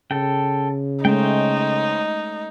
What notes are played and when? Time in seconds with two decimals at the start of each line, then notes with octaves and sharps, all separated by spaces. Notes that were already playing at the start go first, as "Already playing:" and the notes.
0.11 C#3 A4 G5
1.05 G#3 A3 C#4 D#4 C5 G5